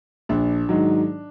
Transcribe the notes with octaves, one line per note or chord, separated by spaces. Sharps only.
A#1 D4
G#2 D#3 F#3